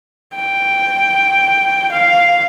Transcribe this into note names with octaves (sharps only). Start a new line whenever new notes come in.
G5
F5